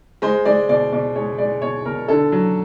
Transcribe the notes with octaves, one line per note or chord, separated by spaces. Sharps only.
G#3 C5
G#3 D5
B2 D5
B2 D5
G#3 C#5
G#3 D5
B2 C#5
B2 A#4
D3 A4
F#3